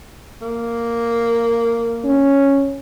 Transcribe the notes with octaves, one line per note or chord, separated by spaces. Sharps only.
A#3
C#4